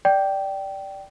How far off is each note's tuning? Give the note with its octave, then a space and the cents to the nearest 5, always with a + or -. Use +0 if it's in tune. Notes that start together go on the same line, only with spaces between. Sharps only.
D5 +0 G5 -15